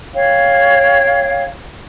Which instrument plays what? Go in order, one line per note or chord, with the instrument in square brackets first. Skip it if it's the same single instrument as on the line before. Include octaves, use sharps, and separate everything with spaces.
[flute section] C#5 F5 G5